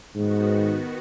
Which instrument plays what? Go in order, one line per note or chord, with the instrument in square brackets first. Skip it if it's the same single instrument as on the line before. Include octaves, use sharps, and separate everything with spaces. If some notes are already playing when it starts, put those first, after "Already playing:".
[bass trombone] G#2 [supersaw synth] D#3 B3 F#4